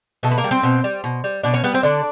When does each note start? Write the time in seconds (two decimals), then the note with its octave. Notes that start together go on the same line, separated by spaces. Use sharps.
0.23 B2 A3 A4
0.31 B4
0.38 A#3 A#4
0.44 G3
0.51 C4 C5
0.63 B2
0.84 G3
1.04 B2
1.24 G3
1.43 B2 D4 D5
1.53 C#4 C#5
1.64 G3 B3 B4
1.74 C4 C5
1.83 D3 D4 D5